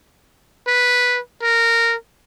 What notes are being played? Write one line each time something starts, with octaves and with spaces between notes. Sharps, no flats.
B4
A#4